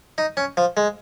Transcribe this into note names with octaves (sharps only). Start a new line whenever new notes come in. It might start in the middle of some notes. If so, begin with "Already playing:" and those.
D#4
C#4
F3
G#3